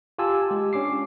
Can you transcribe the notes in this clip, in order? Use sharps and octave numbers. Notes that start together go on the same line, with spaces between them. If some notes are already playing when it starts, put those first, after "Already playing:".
F4 G4 G#5 A5 E6
G#3 G4
C#4 D4 D6 C7